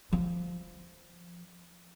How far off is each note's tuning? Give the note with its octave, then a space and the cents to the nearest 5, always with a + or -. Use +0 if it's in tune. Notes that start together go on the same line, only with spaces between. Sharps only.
F3 +0